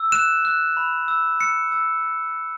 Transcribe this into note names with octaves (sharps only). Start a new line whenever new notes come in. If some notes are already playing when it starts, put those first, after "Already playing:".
Already playing: E6
F#6 E7
F#6
B5
E6
E6 C#7
E6